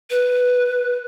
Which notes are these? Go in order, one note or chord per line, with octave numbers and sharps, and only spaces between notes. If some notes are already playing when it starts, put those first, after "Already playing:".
B4